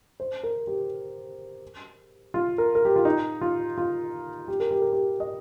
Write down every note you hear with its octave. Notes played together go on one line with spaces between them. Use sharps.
C5
A#4
G4
F4
A#4
A#4
G4
F4
D#4
F4
F4
G4
A#4
G4
A#4
G4
D#5